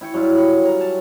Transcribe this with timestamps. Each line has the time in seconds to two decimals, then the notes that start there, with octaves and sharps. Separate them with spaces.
0.01 E4 G5 C#6
0.14 F#3 G3 E4 F4
0.35 B5 C#6
0.63 C#5 A#5
0.81 A5